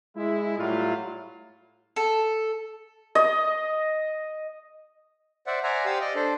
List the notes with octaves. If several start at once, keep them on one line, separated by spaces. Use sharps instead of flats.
G#3 E4
A2 F#3 G3 E4 F4
A4
D#5
C5 D5 E5 F#5
C5 D5 E5 F#5 G#5 A#5
G4 C5 D5 F5 D#6 E6
D5 D#5
D4 A4 C5